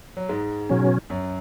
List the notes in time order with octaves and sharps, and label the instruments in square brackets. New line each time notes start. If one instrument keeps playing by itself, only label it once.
[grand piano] F#3
G#2 G#3
[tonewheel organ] B2 F#3 C#4
[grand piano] F#2 F#3